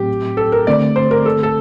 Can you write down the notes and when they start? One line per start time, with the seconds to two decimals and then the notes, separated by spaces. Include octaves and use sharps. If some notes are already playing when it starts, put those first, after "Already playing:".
Already playing: A2 F#3 C4 G4
0.37 A4
0.52 A#4
0.67 D3 A3 C4 D5
0.96 C5
1.11 A#4
1.26 A4
1.43 A4